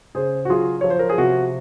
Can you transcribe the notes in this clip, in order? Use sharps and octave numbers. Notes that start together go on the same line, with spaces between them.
C#3 G#4 C5
F#4
F#3 F4 G#4
F3 C#5
C5
A#4
G#4
C3 F#4